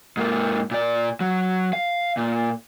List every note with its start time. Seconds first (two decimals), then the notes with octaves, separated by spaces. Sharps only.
0.17 G#2 A#3
0.71 A#2 D5
1.20 F#3
1.73 F5
2.17 A#2